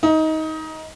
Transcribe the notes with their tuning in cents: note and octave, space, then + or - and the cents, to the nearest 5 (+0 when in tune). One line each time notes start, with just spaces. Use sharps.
D#4 +20